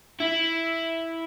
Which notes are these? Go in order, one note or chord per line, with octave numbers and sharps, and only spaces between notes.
E4